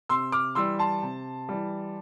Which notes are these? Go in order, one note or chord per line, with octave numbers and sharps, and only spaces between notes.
C3 C6 E6
D6 F6
E3 G3 C6 E6
A5 C6
C3
E3 G3